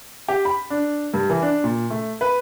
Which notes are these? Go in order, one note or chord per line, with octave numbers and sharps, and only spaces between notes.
G4
B5
D4
G2
E3
D4
A#2
A3
B4